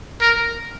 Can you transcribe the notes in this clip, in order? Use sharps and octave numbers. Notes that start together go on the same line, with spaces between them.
A#4